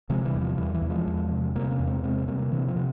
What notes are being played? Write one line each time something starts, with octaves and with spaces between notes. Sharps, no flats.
C3 F3 G#3
E3 G3
E2
F3
E2 E3 G3
E3
E2
F3 G#3
E2
C3
C3 G3 A#3
A#3 C#4
E2
G#3 C4
C3 G#3 C4
C3 G3 A#3
C3 E3
F3
C3